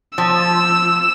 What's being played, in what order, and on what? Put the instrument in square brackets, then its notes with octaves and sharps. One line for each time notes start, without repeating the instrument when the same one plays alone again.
[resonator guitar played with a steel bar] F3 [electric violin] E6